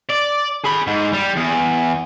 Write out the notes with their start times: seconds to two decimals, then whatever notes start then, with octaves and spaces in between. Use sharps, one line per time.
0.09 D5
0.64 G#4 B5
0.87 G#2
1.13 G3
1.36 E2